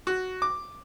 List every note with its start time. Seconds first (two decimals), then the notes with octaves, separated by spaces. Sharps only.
0.07 F#4
0.42 D6